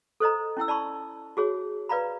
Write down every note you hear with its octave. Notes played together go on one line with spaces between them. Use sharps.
A4 C5 D#5 A#5
C#4 E4 G5 E6
D5 A5 B5 C#6
F#4 G#4 C#5
B4 D5 F5 A#5 B5